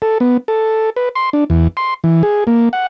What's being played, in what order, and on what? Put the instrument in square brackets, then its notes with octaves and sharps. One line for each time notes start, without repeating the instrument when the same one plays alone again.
[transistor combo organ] A4
B3
A4
B4
C6
D4
E2
C6
E3
G#4
A#3
F#5